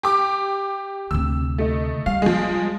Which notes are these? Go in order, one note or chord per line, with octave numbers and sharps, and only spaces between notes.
G4 D6
D2 C3 E6
A3 D#4
G3 F5
F3 G#3